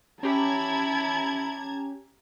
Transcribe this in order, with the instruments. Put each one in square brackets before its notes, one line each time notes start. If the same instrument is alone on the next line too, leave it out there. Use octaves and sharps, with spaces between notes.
[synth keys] C#4 G4 [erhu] E4 [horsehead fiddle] A5 [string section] A#5 G#6